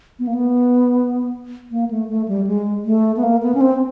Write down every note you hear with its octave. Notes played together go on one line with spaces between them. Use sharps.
B3
A#3
B3
A#3
A3
A3
G3
G#3
A3
B3
A#3
B3
C#4
C4